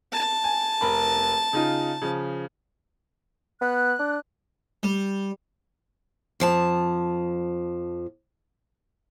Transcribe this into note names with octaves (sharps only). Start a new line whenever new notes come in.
A5
G#5
F1 A#4 B5
C#3 D#4 F4
C#3 F3
B3 F#6
D4
G3
F2 F3 A5